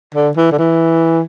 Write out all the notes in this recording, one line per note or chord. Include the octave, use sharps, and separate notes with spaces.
D3
E3
D3
E3